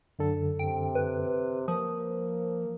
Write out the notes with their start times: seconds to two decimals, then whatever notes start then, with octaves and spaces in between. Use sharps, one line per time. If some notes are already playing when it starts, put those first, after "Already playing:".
0.19 F#2 D3 A4
0.59 C3 G5
0.95 B4
1.68 F3 A#3 D#6